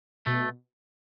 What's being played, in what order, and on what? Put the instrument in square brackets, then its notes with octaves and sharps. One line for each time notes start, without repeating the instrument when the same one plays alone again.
[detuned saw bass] B2 [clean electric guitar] A3